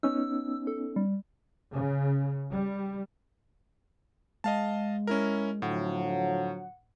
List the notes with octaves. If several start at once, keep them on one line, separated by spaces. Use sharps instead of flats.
B3 C#4 D#4 E6
A4
G3
C#3
G3
G#3 D#5 F5 A5
C#4 E4 A#4
A2 D3 F3 F#3 F#5